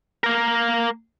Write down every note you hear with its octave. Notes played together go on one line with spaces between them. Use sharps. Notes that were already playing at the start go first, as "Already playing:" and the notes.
A#3 A#4